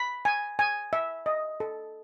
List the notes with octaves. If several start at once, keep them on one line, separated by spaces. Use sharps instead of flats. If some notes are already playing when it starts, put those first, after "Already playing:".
Already playing: B5
G#5
G#5
E5
D#5
A4